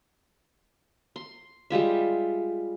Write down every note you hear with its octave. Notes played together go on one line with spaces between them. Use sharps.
C6
G3 G#3 F4 E5